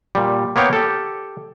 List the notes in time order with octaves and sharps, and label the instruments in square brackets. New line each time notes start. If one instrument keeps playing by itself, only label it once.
[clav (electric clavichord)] A#2 G3
A#3 B3 C#5 F5 G5
G4 A4